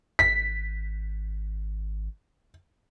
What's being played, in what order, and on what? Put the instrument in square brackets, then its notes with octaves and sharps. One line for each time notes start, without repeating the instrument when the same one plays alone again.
[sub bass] G#1 [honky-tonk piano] B6